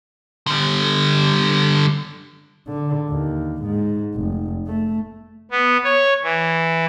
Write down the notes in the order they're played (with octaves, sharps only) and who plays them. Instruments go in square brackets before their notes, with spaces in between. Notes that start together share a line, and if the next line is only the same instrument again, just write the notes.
[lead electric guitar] D3 G3
[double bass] D3
D#2
G#2
F1
A3
[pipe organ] B3
C#5
E3